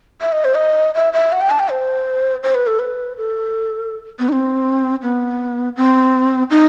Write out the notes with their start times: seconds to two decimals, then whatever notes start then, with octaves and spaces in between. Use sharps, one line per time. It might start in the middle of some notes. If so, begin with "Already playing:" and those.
0.21 E5
0.32 D#5
0.45 C5
0.56 D#5
0.95 E5
1.13 E5
1.32 F#5
1.41 G5
1.50 A5
1.59 G5
1.69 C5
2.43 C5
2.55 B4
2.67 A4
2.79 B4
3.17 A4
4.19 B3
4.29 D#4
4.32 C4
5.02 B3
5.76 C4
6.50 D#4